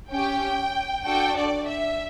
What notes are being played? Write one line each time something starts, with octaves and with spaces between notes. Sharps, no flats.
C#4 G4 G5
D4 F#4 A4 G5
D5
E5